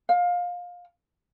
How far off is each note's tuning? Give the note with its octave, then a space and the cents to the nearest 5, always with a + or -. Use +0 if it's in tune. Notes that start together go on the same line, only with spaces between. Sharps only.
F5 +20